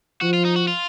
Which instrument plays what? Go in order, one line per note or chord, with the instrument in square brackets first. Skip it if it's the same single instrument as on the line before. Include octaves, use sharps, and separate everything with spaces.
[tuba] F3 [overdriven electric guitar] F#4
[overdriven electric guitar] F4
D#4
F#4
F4